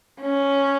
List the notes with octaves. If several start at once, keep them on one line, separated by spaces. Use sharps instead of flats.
C#4